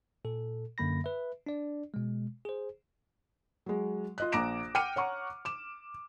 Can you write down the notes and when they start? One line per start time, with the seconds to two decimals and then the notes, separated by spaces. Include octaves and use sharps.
0.25 A#2 A4
0.78 F#2 D3 A#3 B5 A#6
1.04 B4 E5
1.46 D4 D5
1.94 B2 G#3
2.45 G#4 C5
3.66 F#3 G#3
4.18 F4 D#5 F#6
4.32 A#1 A#5 D6 A#6 D7 E7
4.75 F#5 G5 D6 F6 C#7 D#7
4.96 C#5 F#5 A#5 C#6
5.45 D6 E7